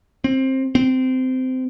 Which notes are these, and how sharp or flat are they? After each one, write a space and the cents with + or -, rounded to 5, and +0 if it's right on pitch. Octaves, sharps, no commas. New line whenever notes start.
C4 +20
C4 -20